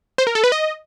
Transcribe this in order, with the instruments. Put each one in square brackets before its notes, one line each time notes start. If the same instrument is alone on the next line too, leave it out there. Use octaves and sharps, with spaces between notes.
[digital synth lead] C5
A#4
A4
B4
D#5